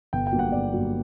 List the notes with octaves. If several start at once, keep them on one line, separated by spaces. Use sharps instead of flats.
G1 G5
G5
G2 F#3 A#3
F#5
G1 D5
G2 F#3 A#3